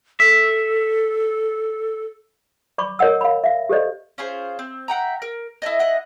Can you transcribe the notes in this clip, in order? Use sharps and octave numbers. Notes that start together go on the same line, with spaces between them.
A4 E5
D5 B5 C#6 D6
A#4 C#5 D#5 F#5 E6
F5 B5
E5 F5
G4 A4 C5 D5 D#5
C#4 F4 G#4 C5
C4
E5 F#5 G5 A#5
A#4
E4 A4 D5 D#5
E4 D#5 F#5